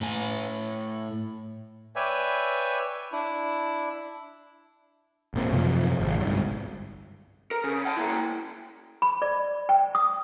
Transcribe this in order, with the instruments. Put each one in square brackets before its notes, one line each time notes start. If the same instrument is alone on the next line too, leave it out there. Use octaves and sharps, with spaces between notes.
[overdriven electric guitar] A2 G#5
[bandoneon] B4 C#5 D5 E5 G5 G#5
D4 E4
[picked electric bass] E1 A#2 C4
F#2 C3 F3
G#1
G1 C2 G#2
[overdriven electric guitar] A#4
C#3
F#5 A5
A#3 E4
[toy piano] B5
D5
G5
D#6